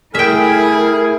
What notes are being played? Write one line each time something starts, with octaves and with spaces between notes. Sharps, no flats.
A3 E4 G#4 A#4 E5 G5